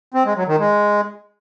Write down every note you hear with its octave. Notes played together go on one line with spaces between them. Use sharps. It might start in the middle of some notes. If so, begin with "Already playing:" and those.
C4
G#3
F#3
D#3
G#3